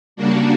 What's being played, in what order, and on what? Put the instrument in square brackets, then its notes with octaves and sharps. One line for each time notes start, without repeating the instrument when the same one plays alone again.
[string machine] C#3 G3 A#3 D4 F#4